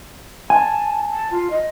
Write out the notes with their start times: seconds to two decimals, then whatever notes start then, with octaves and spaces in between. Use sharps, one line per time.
0.50 G#5 A5
1.13 A5
1.31 F4
1.51 D#5